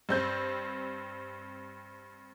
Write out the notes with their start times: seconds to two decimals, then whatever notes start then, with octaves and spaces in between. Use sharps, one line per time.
0.09 G2 C4 G6